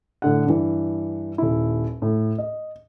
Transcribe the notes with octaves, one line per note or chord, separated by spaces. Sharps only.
A2 D3 F#5
G2 E3
D#1 E4
A2
D#5